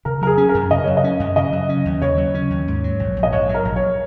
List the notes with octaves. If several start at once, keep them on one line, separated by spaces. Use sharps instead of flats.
C#3 A#4
F#3 A#4
G#4
C#4
A#4
F#2
C#3 D#5
F#3 C#5
D#5
C#4
F#2
C#3 D#5
F#3
C#4
D#2
C#3 C#5
F#3
C#4
D#2
G#2
F#3
A#1
A#1
D#5
G#2 C#5
F#3
A#4
A#1
C#5